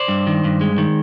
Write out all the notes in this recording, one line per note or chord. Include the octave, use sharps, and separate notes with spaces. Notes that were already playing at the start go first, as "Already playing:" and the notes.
Already playing: C5 D5
G2
D#3
G2
G#3
D#3